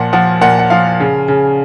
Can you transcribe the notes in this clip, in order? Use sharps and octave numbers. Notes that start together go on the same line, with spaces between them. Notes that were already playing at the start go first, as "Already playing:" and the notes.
Already playing: A#2 F3 F#5
F3 F#5
A#2 F#5
F#5
F3 F5
C#3
C#3